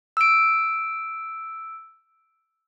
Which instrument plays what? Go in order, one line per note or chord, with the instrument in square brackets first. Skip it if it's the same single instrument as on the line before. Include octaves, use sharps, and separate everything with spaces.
[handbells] E6 D7